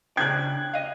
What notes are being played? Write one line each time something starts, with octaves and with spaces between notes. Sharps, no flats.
C#3 D4 G5 F#6 G#6
D#5 F5